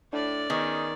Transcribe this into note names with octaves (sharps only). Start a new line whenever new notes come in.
A2 D4 D5
D#3 B3 C#4 D#4 G#4